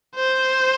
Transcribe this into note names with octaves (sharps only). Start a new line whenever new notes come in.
C5